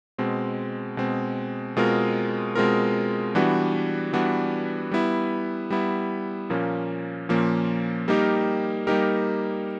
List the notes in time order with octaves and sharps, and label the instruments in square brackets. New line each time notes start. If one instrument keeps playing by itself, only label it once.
[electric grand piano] B2 G#3 C4
B2 G#3 C4
B2 G#3 C4 F4 A#4
B2 G#3 C4 F4 A#4
E3 G3 B3 D4 F#4
E3 G3 B3 D4 F#4
G3 B3 E4
G3 B3 E4
A#2 F3 A#3 C#4
A#2 F3 A#3 C#4
G3 A#3 D#4 G4 A#4
G3 A#3 D#4 G4 A#4